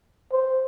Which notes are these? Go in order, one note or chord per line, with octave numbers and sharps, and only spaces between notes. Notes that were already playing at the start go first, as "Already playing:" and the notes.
C5